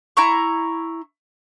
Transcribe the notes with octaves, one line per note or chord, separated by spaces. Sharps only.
E4 A#5 C#6